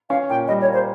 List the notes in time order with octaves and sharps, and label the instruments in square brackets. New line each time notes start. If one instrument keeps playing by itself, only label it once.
[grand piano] C#4 [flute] F5
[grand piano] A#2 [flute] G5
[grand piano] G3 [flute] D#5
[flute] C#5
[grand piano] A#3
[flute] C5